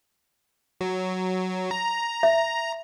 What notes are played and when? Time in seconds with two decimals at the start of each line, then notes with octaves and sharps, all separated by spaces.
0.81 F#3
1.71 A#5
2.23 E5